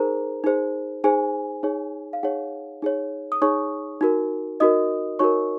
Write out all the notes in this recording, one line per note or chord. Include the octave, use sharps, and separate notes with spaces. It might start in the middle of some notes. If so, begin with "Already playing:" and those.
Already playing: D#4 G#4 A#4 C5 A#5
D#4 G#4 C5
D#4 G#4 C5 G#5
D#4 G#4 C#5
F5
D#4 G#4 C#5 F#5
D#4 G#4 C#5
D#6
D#4 G#4 C#5 C#6
D#4 F#4 A#4
D#4 F#4 A#4 D#5 D#6
D#4 F#4 A#4 C#5 C#6